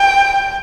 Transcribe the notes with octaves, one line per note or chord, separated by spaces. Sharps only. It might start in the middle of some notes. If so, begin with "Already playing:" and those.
Already playing: G5